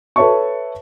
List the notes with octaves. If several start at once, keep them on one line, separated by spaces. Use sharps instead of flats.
A4 B4 C#5 E5 A5 C#6